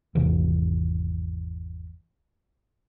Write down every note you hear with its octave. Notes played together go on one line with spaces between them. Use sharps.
G#1 E2 C3 E3